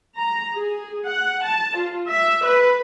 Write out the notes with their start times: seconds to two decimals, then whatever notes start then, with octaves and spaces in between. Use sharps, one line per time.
0.17 A#5
0.55 G#4
1.05 F#5
1.43 A5
1.77 F4
2.09 E5
2.45 B4